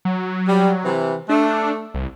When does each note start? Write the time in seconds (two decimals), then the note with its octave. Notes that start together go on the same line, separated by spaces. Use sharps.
0.05 F#3
0.48 G3
0.85 C3 E3
1.29 A3 D4
1.94 C2